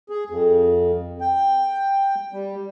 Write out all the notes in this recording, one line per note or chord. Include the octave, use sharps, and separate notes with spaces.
G#4
F2
G5
G3